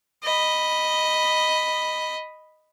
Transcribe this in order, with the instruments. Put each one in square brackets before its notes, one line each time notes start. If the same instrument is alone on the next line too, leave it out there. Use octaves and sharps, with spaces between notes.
[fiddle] D#5 B5